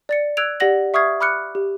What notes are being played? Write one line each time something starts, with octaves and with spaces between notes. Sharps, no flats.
D5 A6 C#7
E6 F#6 G#6 D7 F7
G4 D5 F#5 A#6 F#7
E5 C#6 D#6 F6 G#6 C7
B5 D6 F6 F#6 C#7
G4